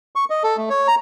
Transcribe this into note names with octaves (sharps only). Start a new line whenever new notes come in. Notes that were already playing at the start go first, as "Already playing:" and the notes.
C#6
D#5
A4
A3
C#5
A#5